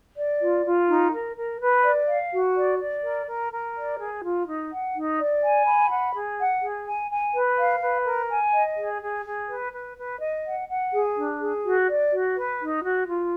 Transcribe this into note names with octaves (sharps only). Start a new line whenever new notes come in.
D5
F4
F4
D#4
A#4
A#4
B4
D5
F5
F#4
D5
D5
A#4
A#4
A#4
D5
G#4
F4
D#4
F#5
D#4
D5
G#5
B5
F#5
G#4
F#5
G#4
G#5
G#5
B4
F5
B4
A#4
G#5
D#5
G#4
G#4
G#4
B4
B4
B4
D#5
F#5
F#5
G#4
D4
G#4
F#4
D5
F#4
B4
D#4
F#4
F4